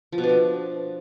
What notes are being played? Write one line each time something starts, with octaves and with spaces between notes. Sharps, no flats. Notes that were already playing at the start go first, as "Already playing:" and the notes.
F3
B2
D4
F3